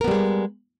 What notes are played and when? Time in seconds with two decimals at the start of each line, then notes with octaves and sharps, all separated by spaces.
0.01 A#4
0.04 B3
0.08 G3
0.11 G#3